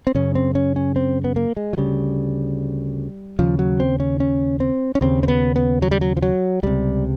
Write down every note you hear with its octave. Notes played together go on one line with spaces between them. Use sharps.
C4
F#2 C#3 C#4
C4
C#4
C#4
C4
B3
A#3
G#3
F#3
D2 C#3 G3
D#2 C#3 F3
F#3
C4
C#4
C#4
C4
C#4
D#2 C#3 C4
C4
B3
B3
F#3
G3
F#3
F3
F#3
C#2 C3 G3